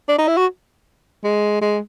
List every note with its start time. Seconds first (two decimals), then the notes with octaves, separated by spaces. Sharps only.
0.08 D4
0.18 D#4
0.28 E4
0.37 F#4
1.24 G#3
1.61 G#3